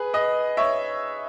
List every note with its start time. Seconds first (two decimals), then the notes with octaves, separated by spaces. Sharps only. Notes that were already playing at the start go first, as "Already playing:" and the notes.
Already playing: G#4 B4
0.13 B4 D#5
0.57 C#5 E5